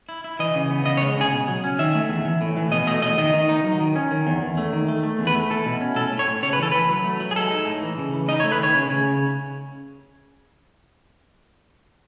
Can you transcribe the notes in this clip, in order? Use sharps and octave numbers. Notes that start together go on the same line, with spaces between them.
E4
E4
E3 D#5
C#3
B3
C#3 D#5
C#5
G#3
C#3 G#4
B2
F#3
C#4
D#3 E5
A3
E2
E3
A2
E3
B2 D#5
A3 D#5
E2 D#5
D#3 D#5
D#3
D#4
F#3
D#3
C#4
D#3
E2
E2
A3
D#3
A3
A3
E2
B4
A3
E4 A4
B2
C#4
A2 A4
A2
C#5
A2
C#3 C#5
B4
E3 A4
E3 B4
F#3
A3
F#3
G#4
G#3 A4
D#4
A2
E3
C#3
E3
D#4 D#5
C#5
A3
B4
D#3 C#5
C#3
C#3